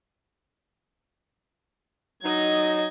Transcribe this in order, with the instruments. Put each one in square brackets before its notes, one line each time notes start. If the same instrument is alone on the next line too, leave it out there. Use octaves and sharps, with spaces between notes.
[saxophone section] F#3 D#4 [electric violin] D#5 G#6